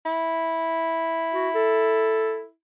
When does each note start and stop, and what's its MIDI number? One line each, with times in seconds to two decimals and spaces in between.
0.06 2.51 64
1.33 1.50 66
1.55 2.44 69